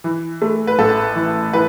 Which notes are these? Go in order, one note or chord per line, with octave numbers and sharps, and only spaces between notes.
E3
A3
B4
A1 A4
E3
E3 B4